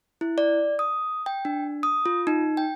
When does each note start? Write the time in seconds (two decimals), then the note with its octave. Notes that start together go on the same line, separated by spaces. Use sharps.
0.21 E4
0.38 D5
0.79 D#6
1.26 G5
1.45 D4
1.83 D#6
2.06 F4
2.27 D#4
2.57 G5